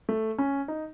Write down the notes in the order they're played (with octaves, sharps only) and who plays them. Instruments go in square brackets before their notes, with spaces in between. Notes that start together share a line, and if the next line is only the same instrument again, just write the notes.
[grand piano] A3
C#4
D#4